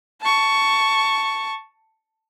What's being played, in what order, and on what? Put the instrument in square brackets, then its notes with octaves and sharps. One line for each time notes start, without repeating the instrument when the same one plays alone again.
[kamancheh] A5 C#6